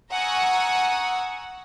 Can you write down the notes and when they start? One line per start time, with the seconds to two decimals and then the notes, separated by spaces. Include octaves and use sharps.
0.10 F#5 G#5 A#5 C#6 D#6 E6